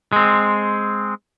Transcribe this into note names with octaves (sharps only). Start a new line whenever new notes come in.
G#3 C4